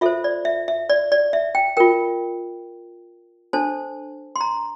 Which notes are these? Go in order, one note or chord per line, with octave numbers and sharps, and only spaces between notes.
F4 A4 C5 E5
D5
E5
E5
D5
D5
E5
G5
F4 A#4 G5
D4 A4 C5 A5
C6
A#5